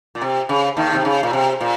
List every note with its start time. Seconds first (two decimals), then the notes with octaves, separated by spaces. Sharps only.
0.15 A#2
0.22 C3
0.49 C#3
0.77 D#2 D#3
0.93 C3
1.05 C#3
1.23 A#2
1.33 C3
1.61 A#2